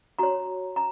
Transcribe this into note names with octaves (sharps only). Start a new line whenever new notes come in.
F#4 C#5 A#5
A#5